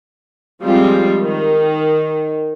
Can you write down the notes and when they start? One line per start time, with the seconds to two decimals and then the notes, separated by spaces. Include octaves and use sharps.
0.63 F3 G3 G#3 C4 F4
1.20 D#3